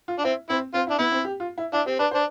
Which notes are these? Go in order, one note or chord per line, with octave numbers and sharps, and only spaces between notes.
F4
D4
C4 E4
C4 E4
C4 F4
E4
D4
B3 E4
C4
G4
F4
E4
D4 E4
C4 G4
D4 B4
C5
D4